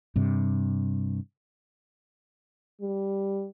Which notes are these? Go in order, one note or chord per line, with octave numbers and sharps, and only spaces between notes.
G2 C3
G3